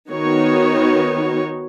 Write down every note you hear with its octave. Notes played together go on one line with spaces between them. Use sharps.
D#3 B3 D#4 F#4 C#5